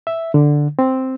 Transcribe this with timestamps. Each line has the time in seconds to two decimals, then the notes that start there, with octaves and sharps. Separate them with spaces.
0.07 E5
0.34 D3
0.79 C4